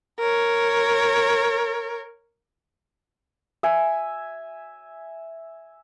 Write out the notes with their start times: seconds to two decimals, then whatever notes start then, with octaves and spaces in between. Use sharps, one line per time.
0.19 A#4 C#5
3.63 E5 G#5